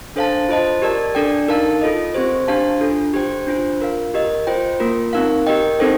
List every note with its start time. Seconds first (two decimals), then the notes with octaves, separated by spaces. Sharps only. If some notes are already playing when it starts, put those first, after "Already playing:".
0.16 D4 A4 C5 F5 A5
0.49 F4 C5 D#5 A5
0.82 G4 A#4 D5 A5
1.15 D4 A4 D5 G5
1.48 D#4 A#4 F5 A5
1.81 F4 A4 D#5
2.14 C4 G4 C5
2.48 D4 G4 C5 F5 A5
2.81 D4 F4 A4
3.14 G4 C5 G5
3.47 D4 F4 C5
3.80 F4 A#4 F5
4.14 G4 A#4 D#5
4.47 F4 C5 G5
4.80 A#3 F4 A#4
5.13 C4 D#4 A#4 F5
5.47 G4 A#4 D#5 G5
5.79 C4 D#4 A4 C5 G5